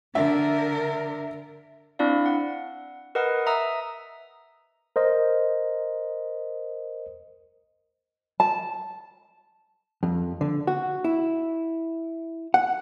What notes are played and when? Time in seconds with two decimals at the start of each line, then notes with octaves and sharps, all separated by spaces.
0.15 D3 D4 A#4 E5
1.99 C4 D4 E4 D5 F5
2.26 F#5
3.15 A#4 B4 D#5 F#5 D#6
3.46 E5 A#5 D#6 E6
4.96 A#4 C5 D#5
8.40 A5
10.03 F2
10.41 D3
10.67 F#4
11.04 E4
12.54 F#5